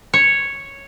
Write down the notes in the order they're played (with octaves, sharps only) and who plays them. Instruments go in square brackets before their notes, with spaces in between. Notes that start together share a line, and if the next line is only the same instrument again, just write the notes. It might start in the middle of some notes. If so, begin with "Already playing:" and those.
[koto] C#5